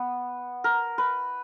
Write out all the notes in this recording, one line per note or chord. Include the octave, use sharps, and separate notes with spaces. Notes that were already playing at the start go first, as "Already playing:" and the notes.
Already playing: B3
A#4
B4